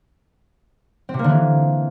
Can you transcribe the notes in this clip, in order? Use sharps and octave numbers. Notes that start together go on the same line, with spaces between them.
C4
C3
A#3
D3
E3